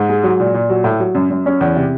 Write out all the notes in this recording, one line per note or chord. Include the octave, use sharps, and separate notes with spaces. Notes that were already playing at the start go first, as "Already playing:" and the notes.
Already playing: G#2
G#3
F#3
A#2
A#2
F#3
A2
F#3
F#2
F#2
C#4
E2
C3